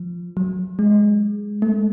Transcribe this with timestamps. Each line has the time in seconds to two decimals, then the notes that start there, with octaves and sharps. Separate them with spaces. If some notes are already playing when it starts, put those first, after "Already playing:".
Already playing: F3
0.37 F#3
0.79 G#3
1.62 A3